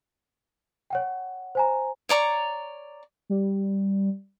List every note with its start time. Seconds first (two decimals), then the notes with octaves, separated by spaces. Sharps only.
0.90 C#5 F#5 G5
1.55 C5 G#5 A#5
2.09 C#5 D5 A#5 C#6
3.30 G3